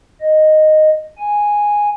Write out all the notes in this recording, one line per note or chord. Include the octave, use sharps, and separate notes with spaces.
D#5
G#5